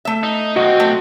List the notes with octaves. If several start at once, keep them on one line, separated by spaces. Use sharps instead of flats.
A3 E5
D#4
B1 C4 F#4 D#5
A3